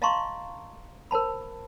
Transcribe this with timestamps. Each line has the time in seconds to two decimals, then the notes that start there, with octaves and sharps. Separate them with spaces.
0.02 D#5 F5 A5 A#5 C6 C#6
1.11 A#4 C5 A5 B5